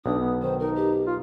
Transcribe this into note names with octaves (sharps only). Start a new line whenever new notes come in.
B1 D4 D#6
B3
D#3 C5
D#4 A#4
G4
F4